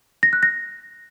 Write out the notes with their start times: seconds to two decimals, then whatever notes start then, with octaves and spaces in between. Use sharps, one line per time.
0.23 A#6
0.33 F#6
0.43 A#6